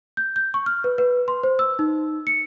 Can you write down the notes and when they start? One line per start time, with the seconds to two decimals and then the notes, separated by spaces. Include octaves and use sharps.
0.17 G6
0.36 G6
0.54 C#6
0.66 F6
0.84 B4
0.98 B4
1.28 C6
1.43 C5
1.59 E6
1.79 D#4
2.27 C#7